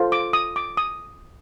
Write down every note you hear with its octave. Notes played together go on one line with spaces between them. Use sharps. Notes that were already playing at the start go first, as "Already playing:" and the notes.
Already playing: F4 A4 C5
D6
D#6
D6
D#6